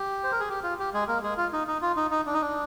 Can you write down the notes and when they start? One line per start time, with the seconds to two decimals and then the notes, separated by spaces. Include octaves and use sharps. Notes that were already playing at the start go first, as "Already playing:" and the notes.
Already playing: G4
0.24 C5
0.32 A#4
0.40 G#4
0.50 G4
0.63 F4
0.79 G4
0.94 G#3 G#4
1.08 A#3 A#4
1.23 G#3 G#4
1.37 F4
1.53 D#4
1.68 D#4
1.82 F4
1.96 D#4
2.11 D#4
2.26 D4
2.34 D#4
2.41 D4